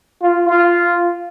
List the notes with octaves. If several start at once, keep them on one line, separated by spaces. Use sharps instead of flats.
F4
F4